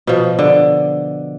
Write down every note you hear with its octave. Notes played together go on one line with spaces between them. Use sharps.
B2 F3
D3